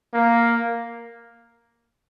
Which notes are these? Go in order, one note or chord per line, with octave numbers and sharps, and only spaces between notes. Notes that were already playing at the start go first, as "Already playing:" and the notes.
A#3